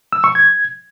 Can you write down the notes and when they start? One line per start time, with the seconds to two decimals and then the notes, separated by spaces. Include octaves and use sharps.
0.13 E6
0.24 C#6
0.35 G#6